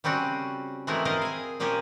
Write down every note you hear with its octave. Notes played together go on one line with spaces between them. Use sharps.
C#3 G3 C4 C#4 F#4
E3 G#3 A3 C4 E4 A#4
E4 A#4 C5 D#5 F5 A5
G#4 G#5
A#2 F3 A#3 C#4 G4